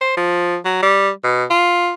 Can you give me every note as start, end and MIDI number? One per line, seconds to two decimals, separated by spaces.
0.01 0.12 72
0.17 0.57 53
0.65 0.82 54
0.83 1.10 55
1.24 1.44 47
1.50 1.93 65